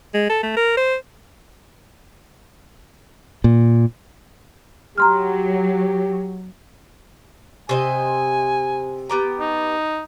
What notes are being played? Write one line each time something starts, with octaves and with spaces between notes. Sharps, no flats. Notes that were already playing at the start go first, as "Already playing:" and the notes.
G#3
A4
A3
A#4
C5
A#2
F#3 G4 A#5 C6 F6
C3 C5 D#5 G#5
B3 G4 A#5
D#4